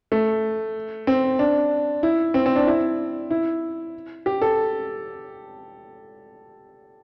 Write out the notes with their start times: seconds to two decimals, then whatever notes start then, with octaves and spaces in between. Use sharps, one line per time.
0.12 A3
1.07 C4
1.39 D4
2.03 E4
2.34 C4
2.46 C4
2.56 D4
2.67 E4
3.31 E4
4.26 G4
4.42 A4